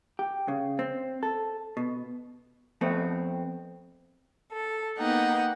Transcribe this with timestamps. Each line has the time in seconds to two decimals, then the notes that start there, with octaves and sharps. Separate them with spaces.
0.19 G4
0.48 C#3
0.79 C4
1.23 A4
1.77 B2
2.81 F2 A3 B3 C4
4.52 A4
4.99 A#3 B3 D#4 F#5 G5